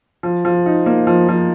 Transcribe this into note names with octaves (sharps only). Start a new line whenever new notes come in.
F3
F3
D#4
A#3
F3
F3